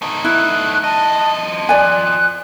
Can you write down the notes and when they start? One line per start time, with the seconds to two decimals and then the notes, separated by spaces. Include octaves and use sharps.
0.02 A3 D#4
0.25 E4 F#6
0.84 F3 D#5 A5
1.69 D5 G#5 F#6